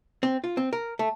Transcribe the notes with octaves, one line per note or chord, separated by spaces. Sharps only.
C4
F4
C4
A#4
A3